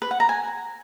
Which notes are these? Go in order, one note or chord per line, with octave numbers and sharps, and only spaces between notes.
B4
F#5
A#5
G#5